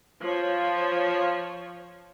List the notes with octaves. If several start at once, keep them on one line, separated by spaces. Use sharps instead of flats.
F3 C#5